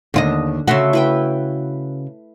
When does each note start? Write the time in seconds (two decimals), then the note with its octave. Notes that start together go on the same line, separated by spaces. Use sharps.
0.14 D#2 D3 F4 D#5
0.68 C#3 A3 F#4 E5 C6
0.93 E4 B4 G5